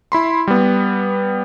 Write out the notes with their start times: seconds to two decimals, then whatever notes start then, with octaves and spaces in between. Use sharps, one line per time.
0.12 E4 B5 C6
0.47 G3 B3